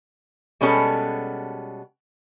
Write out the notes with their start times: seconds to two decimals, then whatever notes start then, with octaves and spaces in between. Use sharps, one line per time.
0.61 B2 G3 G#3 B3 C#4 A4